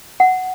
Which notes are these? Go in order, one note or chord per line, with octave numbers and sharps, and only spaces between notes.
F#5